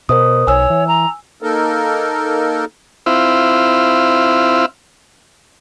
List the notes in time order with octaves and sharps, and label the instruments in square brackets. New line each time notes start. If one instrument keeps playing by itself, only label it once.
[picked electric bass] B2 [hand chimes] A#4 C5 D#6
[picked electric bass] B1 [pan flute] C#5 [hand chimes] G#5 E6
[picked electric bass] E3
[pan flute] A#5
[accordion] A#3 D#4 A4 A#4
[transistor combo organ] C4 E4 F4